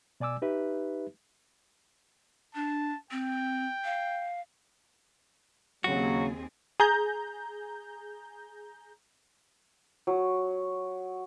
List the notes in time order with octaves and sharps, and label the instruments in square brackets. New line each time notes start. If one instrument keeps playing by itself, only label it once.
[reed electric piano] B2 D5 G#5 D6 E6
D#4 G4 B4 E5
[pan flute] D4 [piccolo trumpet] A5
[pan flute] C4 [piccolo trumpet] G5
[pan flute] F5
[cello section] D#2 C4 G#4 [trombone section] C#3 F#3 [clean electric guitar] F#4
[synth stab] G#4 A#5 G6
[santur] F#3